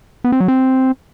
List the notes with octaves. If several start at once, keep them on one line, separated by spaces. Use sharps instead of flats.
B3
C4
F#3
C4